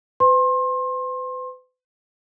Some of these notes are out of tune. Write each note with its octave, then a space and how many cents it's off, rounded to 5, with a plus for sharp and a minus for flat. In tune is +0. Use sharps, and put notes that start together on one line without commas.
B4 +45 C6 +30